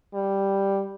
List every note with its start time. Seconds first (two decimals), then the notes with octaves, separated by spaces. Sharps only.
0.15 G3